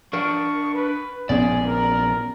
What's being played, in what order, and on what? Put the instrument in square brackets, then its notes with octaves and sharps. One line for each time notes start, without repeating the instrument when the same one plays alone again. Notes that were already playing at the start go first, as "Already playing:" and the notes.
[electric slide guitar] D4 A#4 [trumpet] C#6
[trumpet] B4
[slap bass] A#1 B3 C#4 [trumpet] G#4 [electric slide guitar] D5
[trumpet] A#4